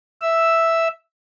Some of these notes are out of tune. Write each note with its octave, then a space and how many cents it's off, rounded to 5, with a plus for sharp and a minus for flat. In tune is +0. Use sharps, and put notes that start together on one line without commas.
E5 +0 E6 +0